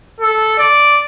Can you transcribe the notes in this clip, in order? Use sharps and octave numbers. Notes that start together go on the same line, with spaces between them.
A4
D5